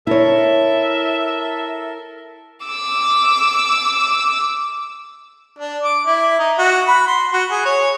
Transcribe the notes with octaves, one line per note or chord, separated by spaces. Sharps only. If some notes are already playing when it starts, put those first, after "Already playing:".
E4 A4 A#4 C#5 E5
D6 E6
D4
D6
E4
D#4
F#4
B5
C6
F#4
G#4
C#5